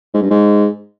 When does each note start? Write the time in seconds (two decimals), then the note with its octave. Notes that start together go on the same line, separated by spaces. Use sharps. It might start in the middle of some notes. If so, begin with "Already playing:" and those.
0.14 G#2
0.22 G2
0.31 G#2